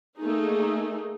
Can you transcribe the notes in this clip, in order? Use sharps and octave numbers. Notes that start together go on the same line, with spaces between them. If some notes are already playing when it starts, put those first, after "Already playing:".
A3 A#3 D#4 G#4